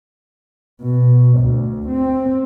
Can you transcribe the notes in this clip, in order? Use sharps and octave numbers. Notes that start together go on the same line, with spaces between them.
B2
D2
C4